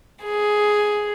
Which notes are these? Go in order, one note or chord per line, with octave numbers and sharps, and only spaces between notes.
G#4